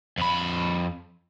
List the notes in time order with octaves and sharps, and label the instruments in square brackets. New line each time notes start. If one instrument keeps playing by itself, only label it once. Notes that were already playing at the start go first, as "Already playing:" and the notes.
[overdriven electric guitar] F2 B5